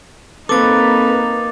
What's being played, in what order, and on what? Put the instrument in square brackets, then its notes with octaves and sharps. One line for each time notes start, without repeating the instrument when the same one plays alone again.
[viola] A#3 D#4 [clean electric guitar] C4 A4 [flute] B4 [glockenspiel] D6 A6